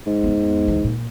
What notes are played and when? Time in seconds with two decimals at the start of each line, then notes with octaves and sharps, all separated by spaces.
0.06 G#2
0.23 E2 B3
0.68 D2 E3
0.84 A#2